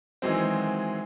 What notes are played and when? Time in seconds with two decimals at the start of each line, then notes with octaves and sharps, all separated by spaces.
0.22 D#3 E3 F#3 G#3 C4